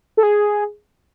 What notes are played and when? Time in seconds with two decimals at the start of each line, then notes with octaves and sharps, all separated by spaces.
0.17 A4
0.23 G#4